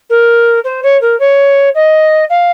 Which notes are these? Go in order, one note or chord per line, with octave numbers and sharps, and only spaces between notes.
A#4
C5
C#5
A#4
C#5
D#5
F5